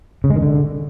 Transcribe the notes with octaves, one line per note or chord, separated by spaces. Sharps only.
C#3
G#3
D#3
D3